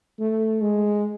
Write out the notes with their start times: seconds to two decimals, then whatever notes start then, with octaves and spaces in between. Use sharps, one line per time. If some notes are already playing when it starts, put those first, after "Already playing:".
0.19 A3
0.61 G#3